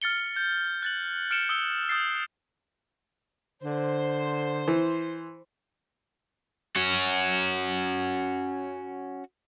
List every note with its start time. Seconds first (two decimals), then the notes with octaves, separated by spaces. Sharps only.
0.02 F6 A6 C#7 G7
0.36 G6
0.82 F#6 A6 F#7
1.31 F6 C#7 D7 E7 G7
1.49 D#6 E6 G7
1.89 D#6 G6 A6 C7
3.63 D3 C5
4.68 E3
6.76 C#4 F#4